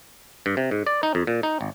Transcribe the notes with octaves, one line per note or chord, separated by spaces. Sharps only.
G2
C3
G#2
D5
D#4
F2
A#2
D#4
G#1